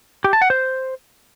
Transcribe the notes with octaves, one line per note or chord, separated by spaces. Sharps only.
G4
A5
F#5
C5